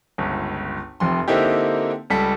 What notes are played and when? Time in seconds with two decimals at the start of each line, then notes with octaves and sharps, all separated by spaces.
0.18 G1 C#2
1.00 F1 F2 C6
1.28 D3 A#3 C4 D#4 E4 G4
2.10 C#2 G3 A4 B6